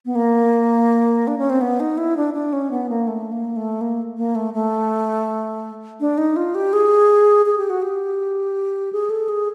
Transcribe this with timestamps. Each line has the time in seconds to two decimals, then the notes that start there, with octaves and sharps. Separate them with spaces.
0.06 B3
0.15 A#3
1.27 D4
1.38 C#4
1.50 C4
1.61 B3
1.80 D#4
1.98 E4
2.17 D4
2.34 D4
2.53 C#4
2.71 B3
2.89 A#3
3.07 A3
3.32 A#3
3.56 A3
3.81 A#3
4.17 A#3
4.35 A3
4.54 A3
6.00 D4
6.18 D#4
6.36 F4
6.55 G4
6.73 G#4
7.46 G#4
7.58 G4
7.70 F#4
7.82 G4
8.93 G#4
9.10 A4
9.29 G#4